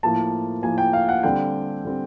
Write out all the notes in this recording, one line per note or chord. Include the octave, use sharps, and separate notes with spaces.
A2 F3 A#3 A5
A2 F3 A#3 G#5
G5
F5
F#5
D3 G3 C4 G5
D3 G3 C4